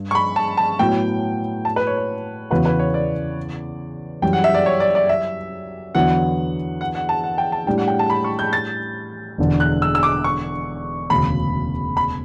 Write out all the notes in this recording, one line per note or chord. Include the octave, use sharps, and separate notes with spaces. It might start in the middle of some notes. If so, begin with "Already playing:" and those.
Already playing: G2
C#6
B5
A5
A5
A2 F#3 B3 G5
A5
B4
C#5
C#5
E2 C#3 E3 B3 F#4 B4
B4
C#5
D5
F#2 E3 G3 G5
F#5
E5
D5
C#5
D5
D5
E5
E2 D3 F#3 B3 E4 F#5
F#5
F#5
A5
F#5
G5
A5
A2 G3 D4 G5
F#5
G5
A5
B5
C#6
G6
A6
E1 E2 D3
F#6
E6
E6
D6
C#6
E1 D2 C#3 B5
B5